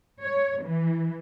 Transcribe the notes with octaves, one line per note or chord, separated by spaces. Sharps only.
C#5
E3